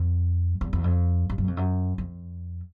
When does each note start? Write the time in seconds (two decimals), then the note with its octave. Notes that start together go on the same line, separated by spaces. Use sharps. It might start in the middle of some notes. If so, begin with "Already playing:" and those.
Already playing: F2
0.61 E2
0.73 E2
0.84 F2
1.30 G2
1.38 F#2
1.48 F2
1.57 F#2
1.98 F2